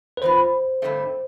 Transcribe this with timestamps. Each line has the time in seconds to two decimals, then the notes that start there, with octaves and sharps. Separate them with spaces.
0.17 B4
0.22 E3 B3 F4 C5
0.82 G2 D3 F3 A3 C4